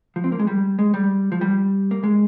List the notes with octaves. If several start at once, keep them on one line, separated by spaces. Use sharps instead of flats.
F3
C4
A#3
G#3
G3
G#3
G3
F3
G3
A#3
G#3